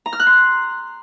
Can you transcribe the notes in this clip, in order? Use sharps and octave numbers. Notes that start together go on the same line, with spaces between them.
A#5
F6
F#6
C6